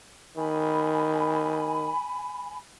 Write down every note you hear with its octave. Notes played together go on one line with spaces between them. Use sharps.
D#3 G#5 B5